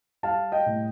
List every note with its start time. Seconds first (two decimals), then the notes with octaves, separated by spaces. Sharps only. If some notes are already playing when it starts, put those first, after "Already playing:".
0.23 G3 F5 A5
0.52 D#5 G5
0.66 A2